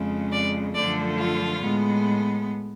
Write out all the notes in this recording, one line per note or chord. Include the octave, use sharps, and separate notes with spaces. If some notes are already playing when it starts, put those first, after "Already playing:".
Already playing: F2 C#3 G#3
D5
F#2 D3 F3 A3 D5
F4
A2 G#3 B3